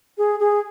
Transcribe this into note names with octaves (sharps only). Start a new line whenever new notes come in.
G#4
G#4